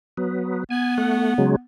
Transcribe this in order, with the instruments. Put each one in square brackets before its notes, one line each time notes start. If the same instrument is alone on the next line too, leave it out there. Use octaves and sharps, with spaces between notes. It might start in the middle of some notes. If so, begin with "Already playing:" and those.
[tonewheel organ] F#3 B3
[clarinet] B3 [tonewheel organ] G#5
[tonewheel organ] A3 F#5
C#3 F#3 G#3